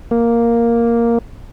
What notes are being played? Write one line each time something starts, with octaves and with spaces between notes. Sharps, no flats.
A#3